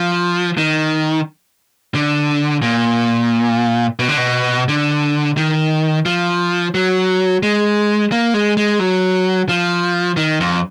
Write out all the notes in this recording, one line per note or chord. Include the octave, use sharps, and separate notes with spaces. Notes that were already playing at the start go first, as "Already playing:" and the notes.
Already playing: F3
D#3
D3
A#2
B2
D3
B2
D3
D#3
F3
F#3
G#3
A#3
G#3
G#3
F#3
F3
D#3
F2